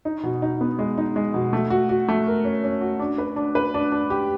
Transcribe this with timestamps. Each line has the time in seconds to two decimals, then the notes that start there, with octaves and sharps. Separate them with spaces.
0.05 D#4
0.23 B2
0.42 D#4
0.61 B3
0.79 G#3
0.98 D#4
1.16 G#3
1.34 B2
1.53 A3
1.70 F#4
1.89 F#4
2.08 A3
2.27 A#4
2.45 C#4
2.64 C#4
2.81 F#4
2.99 D4
3.18 B4
3.36 D4
3.55 B4
3.74 D4
3.92 D4
4.10 G4